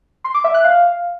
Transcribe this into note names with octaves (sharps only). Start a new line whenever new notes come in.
C6
D6
E5
F#6
F5